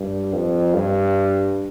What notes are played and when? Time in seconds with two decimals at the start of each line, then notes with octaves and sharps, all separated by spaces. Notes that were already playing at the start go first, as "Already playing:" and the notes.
Already playing: G2
0.33 F2
0.75 G2